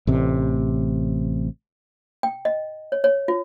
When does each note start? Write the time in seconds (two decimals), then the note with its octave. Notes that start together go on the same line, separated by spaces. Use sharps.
0.07 A1 C3
2.23 G5
2.45 D#5
2.92 C#5
3.04 C#5
3.28 F4